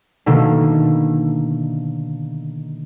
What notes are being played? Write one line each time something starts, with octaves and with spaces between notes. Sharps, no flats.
B2 D3 D#3 A3 A#3